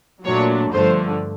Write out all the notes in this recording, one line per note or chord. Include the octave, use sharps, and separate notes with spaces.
A#2 F#3 A3 D4 C#5
G2 D3 F3 A3 C5